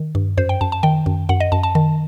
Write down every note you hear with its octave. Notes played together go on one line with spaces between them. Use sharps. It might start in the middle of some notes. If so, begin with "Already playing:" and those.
Already playing: D#3
G2
F#2 C5
G5
F#2 A5
A5
D#3 G5
F#2
F#2 F#5
D#5
F#2 A5
A5
D#3